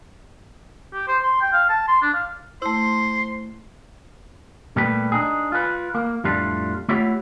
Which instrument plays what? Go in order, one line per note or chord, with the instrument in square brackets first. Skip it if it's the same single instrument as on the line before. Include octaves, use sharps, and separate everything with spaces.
[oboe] G4
C5
C6
G5
F5
A5
C6
D4
F5
[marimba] A3 E4 [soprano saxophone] C5 [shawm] C6
[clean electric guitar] A#2 G3 A3 G4 B4
D4 D#4 G#4
F4 B4
A#3
F2 A2 G3 A3 D4 F4
A3 E4 F4 G4 C#5 F#5